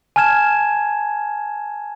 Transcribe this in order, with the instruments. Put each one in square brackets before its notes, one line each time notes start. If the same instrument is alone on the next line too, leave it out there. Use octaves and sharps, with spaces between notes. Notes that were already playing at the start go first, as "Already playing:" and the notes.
[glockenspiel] G#5 A5 F6 G#6 E7